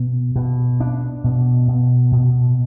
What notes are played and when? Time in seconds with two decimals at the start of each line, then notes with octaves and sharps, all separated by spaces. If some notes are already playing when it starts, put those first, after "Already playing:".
Already playing: B2
0.36 B2
0.80 D4
1.24 B2
1.68 B2
2.12 B2